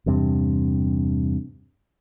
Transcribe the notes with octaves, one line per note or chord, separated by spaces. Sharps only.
E2 G2 C3